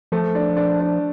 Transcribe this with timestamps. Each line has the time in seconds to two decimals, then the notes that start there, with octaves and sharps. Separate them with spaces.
0.12 F3 A3
0.35 D4
0.57 D4
0.80 D4